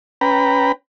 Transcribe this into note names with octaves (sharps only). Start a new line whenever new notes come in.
C#4 B4 G5 A#5 B5